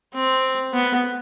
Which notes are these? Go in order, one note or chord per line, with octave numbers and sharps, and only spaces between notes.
C4
B3